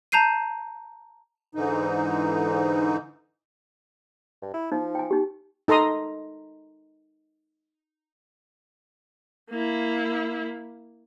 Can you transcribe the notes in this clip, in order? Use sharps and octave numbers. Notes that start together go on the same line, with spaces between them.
A5 A#5 G6 C7 D#7
G#2 D3 E3 D#4
G2
E4
F3 D#4
G5 G#5
D#4 G4
D#4 A4 A#5 C6 D#6
A#3 E4